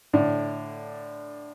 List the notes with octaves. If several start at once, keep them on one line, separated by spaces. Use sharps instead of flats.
A2 D3 D4